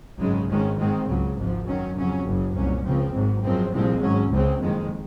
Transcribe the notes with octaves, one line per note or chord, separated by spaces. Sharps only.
G#1 F#2 C#3 G#3
G#1 G#2 D#3 G#3 C#4
G#2 D#3 G#3 C4
C#2 C#3 F#3
G#1 G#2 F3
F#2 D#3 F#3 C#4
F2 C#3 F#3 C#4
F#1 F#2 C#3
C2 A#2 F#3 C#4
C#2 C#3 F3 C4
G#1 G#2 F#3
F#2 F3 G#3 C4
C2 A#2 F3 G#3 C4
G#1 G#2 F#3 C#4
C#2 C#3 G#3 C4
F#1 F2 D#3 G#3